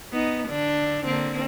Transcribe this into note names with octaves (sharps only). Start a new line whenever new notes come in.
B3 D#4
D3 D4
D3 A#3 C4